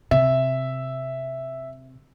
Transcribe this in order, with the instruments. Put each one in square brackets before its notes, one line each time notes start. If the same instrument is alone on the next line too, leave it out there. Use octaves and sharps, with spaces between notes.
[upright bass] C3 [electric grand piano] E5